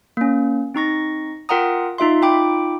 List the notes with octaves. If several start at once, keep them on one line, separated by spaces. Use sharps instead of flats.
A#3 C#4
C4 D#4 C#6 A#6
F4 A#4 F#5 G5 A#5 D#6
D#4 F4 E5 C6
D#4 F4 G5 B5 D6 D7